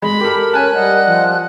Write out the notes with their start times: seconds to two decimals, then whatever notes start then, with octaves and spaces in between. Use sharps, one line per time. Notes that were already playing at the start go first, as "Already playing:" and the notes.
0.02 G#3 B5
0.20 G4 A4 A#4
0.53 C#4 G#5 A5 F#6
0.75 G3 A#4 D#5 F#5
1.06 F3